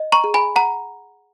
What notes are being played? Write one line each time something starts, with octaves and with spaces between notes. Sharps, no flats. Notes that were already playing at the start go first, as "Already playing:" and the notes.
Already playing: D#5
A#5 C#6
G#4
G#5 B5
F#5 A#5